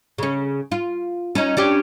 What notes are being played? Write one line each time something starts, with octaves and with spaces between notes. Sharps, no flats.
C#3 C#4
F4
C#4 D#4
C#4 D4 G4